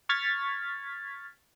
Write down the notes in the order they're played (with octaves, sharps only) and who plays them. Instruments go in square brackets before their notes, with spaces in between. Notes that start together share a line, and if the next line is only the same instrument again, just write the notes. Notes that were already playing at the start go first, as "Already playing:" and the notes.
[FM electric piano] C#6 F6 G#6 A6 B6